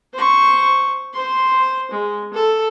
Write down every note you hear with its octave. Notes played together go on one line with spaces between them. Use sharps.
C5 C#6
C5 C6
G#3
A4